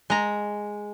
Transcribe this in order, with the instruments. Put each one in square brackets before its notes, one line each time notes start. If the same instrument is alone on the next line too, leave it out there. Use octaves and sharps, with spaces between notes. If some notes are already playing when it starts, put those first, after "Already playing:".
[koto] G#3 A#5